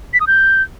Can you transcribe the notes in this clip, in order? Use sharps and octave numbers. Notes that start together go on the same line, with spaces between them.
B6
D#6
G6